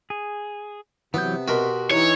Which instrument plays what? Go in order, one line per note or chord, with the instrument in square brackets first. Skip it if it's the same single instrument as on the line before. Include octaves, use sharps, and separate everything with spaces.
[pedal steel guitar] G#4
[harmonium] C3 [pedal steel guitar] E3 F#3 G6 [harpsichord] B3
[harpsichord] B2 A#4 B5 [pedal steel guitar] F#4 G4 C6
[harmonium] E3 D#4 E4 [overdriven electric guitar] C#5